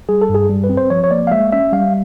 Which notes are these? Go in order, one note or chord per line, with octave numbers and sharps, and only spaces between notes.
G3 G#4
A4
G2
G#4
G3
B4
C4
C5
F3 C#5
C#5
A#3 D5
F5
G#3 E5
C#4 E5
G3 F5